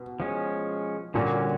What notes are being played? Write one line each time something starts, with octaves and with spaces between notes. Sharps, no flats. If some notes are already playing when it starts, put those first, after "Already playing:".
Already playing: B2
F3 G#3 C#4
A#2 D3 G3 A#3 C#4 F#4